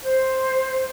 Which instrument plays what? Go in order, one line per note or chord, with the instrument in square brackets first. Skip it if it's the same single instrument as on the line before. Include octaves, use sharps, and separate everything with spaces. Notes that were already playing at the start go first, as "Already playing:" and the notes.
[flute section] C5